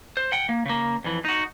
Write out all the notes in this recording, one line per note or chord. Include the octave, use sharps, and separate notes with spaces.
C5
F#5 G5
A#3
C#3 A#3
F2 E3
D#4 F#4